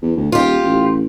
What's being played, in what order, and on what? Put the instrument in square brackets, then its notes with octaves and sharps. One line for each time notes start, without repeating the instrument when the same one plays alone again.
[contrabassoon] E2
D2
[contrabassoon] D#1 [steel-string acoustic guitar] F4 G4
[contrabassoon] A1